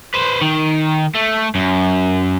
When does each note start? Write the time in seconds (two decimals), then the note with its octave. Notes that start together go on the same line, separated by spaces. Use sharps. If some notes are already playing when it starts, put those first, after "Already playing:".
0.14 B4 C5
0.41 D#3
1.15 A3
1.55 F#2